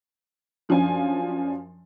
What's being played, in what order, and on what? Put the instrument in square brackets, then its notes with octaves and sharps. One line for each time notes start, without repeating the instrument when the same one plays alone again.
[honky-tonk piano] F#2 F3 C#4 D4 G#5